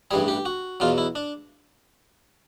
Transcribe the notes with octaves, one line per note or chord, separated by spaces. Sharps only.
A1 G2 E3 G3 G#4
G4
F#4
E2 B2 F#3 F4
E4
D4